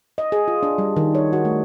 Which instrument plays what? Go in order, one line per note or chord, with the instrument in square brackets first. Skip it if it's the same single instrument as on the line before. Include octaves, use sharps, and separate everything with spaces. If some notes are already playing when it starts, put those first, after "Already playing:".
[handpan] D#5
G#4
F4
D4
G3
D#3
C#5
F#4
A3